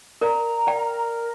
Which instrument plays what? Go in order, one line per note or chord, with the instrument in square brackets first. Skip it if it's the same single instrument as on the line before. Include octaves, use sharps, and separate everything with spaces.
[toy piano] A#4 D5 [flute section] A#5
[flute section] A#4 [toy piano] D5 G5